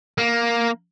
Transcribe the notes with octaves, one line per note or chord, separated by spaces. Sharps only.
A#3